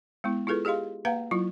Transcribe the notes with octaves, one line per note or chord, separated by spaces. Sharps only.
G#3 B3 E4
E4 F4 G#4 A4 B4
G4 G#4 D#5 F5 C6
A#3 B4 F5 F#5 A#5
F#3 E4 F4